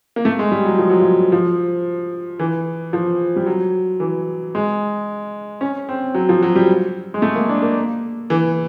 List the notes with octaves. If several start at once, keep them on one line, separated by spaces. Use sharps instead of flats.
A#3
A3
G#3
G3
F#3
F3
F#3
F3
F3
E3
F3
G3
F#3
E3
G#3
C#4
C4
F#3
F3
F#3
G3
G#3
A3
A#3
D4
A#3
E3